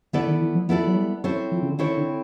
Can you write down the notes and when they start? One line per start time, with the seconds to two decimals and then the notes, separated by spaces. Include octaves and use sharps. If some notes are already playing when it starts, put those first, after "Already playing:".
0.13 D3 B3 E4 A4 D5
0.27 D#3
0.42 E3
0.55 F3
0.68 F3 B3 E4 A4 D5
0.87 F#3
0.96 G3
1.24 F#3 C4 E4 A4 C#5
1.52 F3
1.62 C#3
1.71 D3
1.79 D#3 C4 E4 A4 C#5
1.97 D3